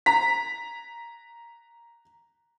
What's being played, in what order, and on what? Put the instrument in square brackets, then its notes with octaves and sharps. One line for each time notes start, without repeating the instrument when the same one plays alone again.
[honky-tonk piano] A#5 B6